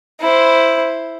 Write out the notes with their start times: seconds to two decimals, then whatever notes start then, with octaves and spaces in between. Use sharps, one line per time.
0.21 E4 C5